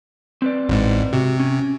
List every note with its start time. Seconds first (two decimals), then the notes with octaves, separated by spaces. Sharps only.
0.42 C4 B4 D5
0.69 A1 G#2
1.13 C3 F#4
1.40 C#4